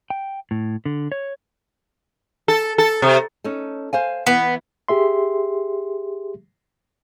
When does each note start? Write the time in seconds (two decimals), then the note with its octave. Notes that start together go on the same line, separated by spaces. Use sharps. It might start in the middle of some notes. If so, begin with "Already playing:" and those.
0.10 G5
0.51 A2
0.86 D3
1.12 C#5
2.48 A4
2.78 A4
3.02 C3
3.44 C#4 D#4 A4
3.93 C5 F5 G#5
4.27 E3 B3
4.88 G4 G#4 E5 C6